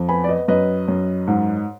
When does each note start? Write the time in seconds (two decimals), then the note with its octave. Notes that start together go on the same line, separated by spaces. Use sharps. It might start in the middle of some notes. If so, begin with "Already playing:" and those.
Already playing: F2
0.09 B3 G#5 B5
0.24 D5
0.29 B4 D#5
0.48 F#2 B4 D#5
0.88 F#2
1.27 G#2